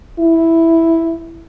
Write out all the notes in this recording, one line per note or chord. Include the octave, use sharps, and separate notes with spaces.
E4